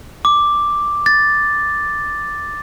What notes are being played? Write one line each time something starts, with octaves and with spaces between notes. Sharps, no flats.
D6
A6